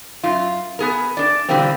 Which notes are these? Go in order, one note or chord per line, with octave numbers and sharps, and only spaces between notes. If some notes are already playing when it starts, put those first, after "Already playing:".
F#2 F4
B3 G#4 A#4
D4 D5
B2 D3 E3 G3 A#3 C4